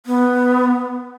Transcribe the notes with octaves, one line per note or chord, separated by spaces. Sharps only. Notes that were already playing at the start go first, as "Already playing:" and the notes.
B3